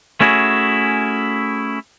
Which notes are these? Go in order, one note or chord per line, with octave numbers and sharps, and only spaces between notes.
A3 C#4 E4 F#4 G#4